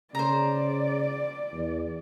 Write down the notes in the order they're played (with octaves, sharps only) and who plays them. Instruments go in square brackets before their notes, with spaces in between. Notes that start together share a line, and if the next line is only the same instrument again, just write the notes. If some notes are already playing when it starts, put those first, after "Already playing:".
[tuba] C#3 [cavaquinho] C5 A#5 [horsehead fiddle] D5
[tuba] E2